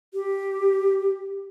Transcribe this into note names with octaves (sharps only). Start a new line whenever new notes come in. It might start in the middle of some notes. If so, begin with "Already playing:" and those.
G4